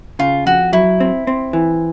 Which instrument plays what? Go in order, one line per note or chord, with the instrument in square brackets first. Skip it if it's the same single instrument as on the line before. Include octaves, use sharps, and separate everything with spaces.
[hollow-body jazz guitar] C#3 [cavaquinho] F4
[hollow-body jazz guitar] F2 [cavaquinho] F#4
[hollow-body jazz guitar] F#3 [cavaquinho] E4
[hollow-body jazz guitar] C4
C4
E3